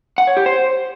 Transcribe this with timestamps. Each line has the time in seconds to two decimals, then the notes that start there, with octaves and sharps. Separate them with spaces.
0.18 F#5
0.27 C#5
0.37 G4
0.46 C5